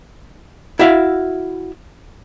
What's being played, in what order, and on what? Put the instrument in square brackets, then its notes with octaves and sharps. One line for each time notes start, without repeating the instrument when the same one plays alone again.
[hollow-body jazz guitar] E4 F#4 E5 F5